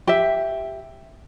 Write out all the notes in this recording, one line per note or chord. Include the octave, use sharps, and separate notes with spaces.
G4 E5